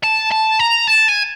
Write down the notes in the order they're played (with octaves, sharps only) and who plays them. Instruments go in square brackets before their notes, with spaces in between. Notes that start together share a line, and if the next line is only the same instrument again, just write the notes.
[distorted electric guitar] A5
A5
A#5
A5
G#5